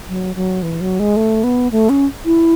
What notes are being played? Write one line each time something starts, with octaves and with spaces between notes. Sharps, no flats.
F#3
F#3
E3
F#3
G#3
A3
B3
A3
C#4
E4